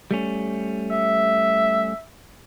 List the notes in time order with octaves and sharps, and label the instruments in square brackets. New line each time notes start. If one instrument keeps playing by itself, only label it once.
[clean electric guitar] G3 A3 C#4
[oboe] E5